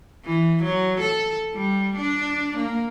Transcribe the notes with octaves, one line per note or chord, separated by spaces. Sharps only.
E3
F#3
A4
G3
D4
A#3